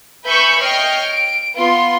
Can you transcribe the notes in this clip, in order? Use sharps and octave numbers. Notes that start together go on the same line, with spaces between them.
B4 E5 G#5 B5 C#6 G6
C#5 D#5 G5 F6 C7
D7
B3 F4 C6